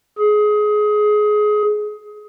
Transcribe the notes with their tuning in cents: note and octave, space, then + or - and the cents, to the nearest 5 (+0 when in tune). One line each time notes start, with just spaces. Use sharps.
G#4 +20